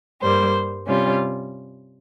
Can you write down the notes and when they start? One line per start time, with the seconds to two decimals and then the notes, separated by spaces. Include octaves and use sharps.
0.21 G2 G3 A#3 C5
0.86 C3 G3 C#4 F4